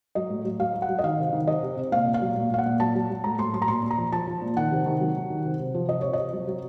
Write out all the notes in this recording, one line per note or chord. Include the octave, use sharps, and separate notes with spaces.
F#3 D#5
A2
F#3
F#3 F5
F#3
F#5
F#3
D#5
D#3 F5
C3
D#3
C3 D#5
C3
C3
A#2 F5
A#2
F5
F#3
A#2
A#2 F5
F#5
A#2
F#3 A5
F#3
F#3
A2 A#5
A2 C6
F#3 C6
A#5
A#2 C6
A#2
A#5
F3
F3 A5
F3
A#2
D#3 F#5
C3
D#3
F#3
F#3
D#3
C3
C3
F3
F3 D#5
C3 C#5
C3 D#5
F#3
F#3